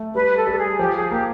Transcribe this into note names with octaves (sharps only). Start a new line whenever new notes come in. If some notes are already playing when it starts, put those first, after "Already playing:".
Already playing: A3
G3 B4
A4
G3 A4
G#4
F3 G4
G#4
A#3 G4